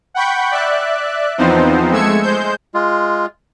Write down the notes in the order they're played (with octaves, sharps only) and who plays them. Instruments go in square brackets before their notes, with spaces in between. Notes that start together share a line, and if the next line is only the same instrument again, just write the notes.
[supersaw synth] F#5 G5 B5 C#6 G6
D5 E5 F#6
E2 F3 B3 C4 D#4 C5
G#3 A3 E6 G#6 C#7
G#3 C5 G6
[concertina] G#3 F4